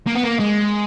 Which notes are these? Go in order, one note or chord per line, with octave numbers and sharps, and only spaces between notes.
A#3
B3
A#3
G#3